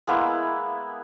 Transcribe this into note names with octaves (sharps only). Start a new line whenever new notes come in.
G#3 A#3 B3 E4